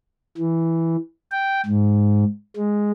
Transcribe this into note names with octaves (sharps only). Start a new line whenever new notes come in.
E3
G5
G#2
G#3